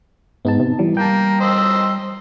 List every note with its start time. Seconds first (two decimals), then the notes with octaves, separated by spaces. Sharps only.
0.45 G#2 B3 D#4 A5
0.60 C3
0.79 E3 G3
0.97 A#3 G5 A5
1.40 C5 D#5 E6